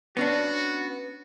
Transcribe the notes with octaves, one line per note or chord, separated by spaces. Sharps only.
B3 C#4 D4 F#4